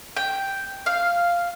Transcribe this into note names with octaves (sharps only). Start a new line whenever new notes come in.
G5
F5